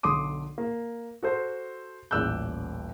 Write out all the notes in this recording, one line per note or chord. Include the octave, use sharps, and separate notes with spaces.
B1 D3 C6 D6 D#6
A#3
F#4 A4 C5
D#1 A1 D5 E6 F#6 G6